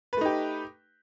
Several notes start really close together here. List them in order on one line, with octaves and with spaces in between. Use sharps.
B4 A3 D#4 G4